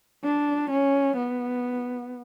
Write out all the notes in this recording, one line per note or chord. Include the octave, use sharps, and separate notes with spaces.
D4
C#4
B3